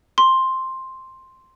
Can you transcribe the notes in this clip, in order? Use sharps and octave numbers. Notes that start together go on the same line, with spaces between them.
C6